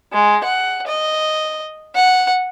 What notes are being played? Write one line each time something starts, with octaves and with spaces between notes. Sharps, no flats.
G#3
F#5
D#5
F#5